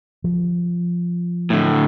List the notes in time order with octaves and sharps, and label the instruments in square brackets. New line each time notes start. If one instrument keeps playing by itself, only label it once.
[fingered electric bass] F3
[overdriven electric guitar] A2 D3